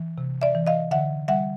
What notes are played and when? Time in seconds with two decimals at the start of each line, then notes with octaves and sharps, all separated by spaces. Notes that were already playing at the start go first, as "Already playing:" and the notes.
Already playing: E3
0.18 C3
0.42 D5 E5
0.55 E3
0.67 D#5 F5
0.91 D3 E5 F#5
1.28 G3 E5 F#5